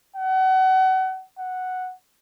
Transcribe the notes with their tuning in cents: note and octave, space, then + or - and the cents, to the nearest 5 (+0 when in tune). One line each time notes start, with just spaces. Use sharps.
F#5 +30
F#5 -5